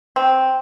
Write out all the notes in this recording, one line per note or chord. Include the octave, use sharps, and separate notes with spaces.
C4